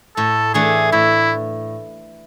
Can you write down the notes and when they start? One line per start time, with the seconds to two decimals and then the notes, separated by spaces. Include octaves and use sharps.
0.16 A2 A4
0.54 E3 A3 D4 G#4
0.92 A2 E4